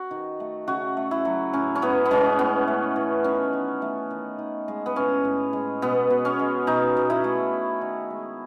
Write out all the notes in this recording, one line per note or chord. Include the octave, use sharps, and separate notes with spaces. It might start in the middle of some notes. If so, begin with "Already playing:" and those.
Already playing: F#4
D#3
A3
C#3 F#4
A3
E4
F#3
A2 C#4
C#4
A2 B3
B3
G#3 C#4
A2 B3
A3
E3
D#3 C#4
D#3
A3
D#3
D#3
G#3
B3
A2 C#4
A2
G#3
B2 B3
B2
C#4
G#3
B2 D#4
B2
E4
A3
D#3
D#3
G#3